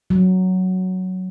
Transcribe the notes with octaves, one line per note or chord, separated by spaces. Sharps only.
F#3